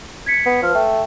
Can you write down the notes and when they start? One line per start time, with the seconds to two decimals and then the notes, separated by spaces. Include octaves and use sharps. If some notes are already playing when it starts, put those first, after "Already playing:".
0.26 G#6 B6 C#7
0.46 B3
0.62 F3 B4 A5 F6
0.75 A3 G5